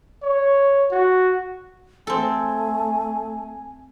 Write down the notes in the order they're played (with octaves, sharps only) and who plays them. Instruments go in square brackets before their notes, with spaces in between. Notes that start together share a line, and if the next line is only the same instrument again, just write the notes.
[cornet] C#5
F#4
[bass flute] A3 [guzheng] C4 A4 [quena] G#5